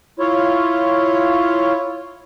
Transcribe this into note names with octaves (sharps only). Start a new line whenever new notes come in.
E4 F4 C#5